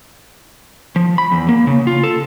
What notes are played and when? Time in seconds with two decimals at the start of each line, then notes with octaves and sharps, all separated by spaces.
0.96 F3
1.18 B5
1.32 E2
1.49 A#3
1.67 C#3
1.87 F4
2.03 A4